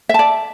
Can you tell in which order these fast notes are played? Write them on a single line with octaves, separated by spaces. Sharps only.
E5 A5 D5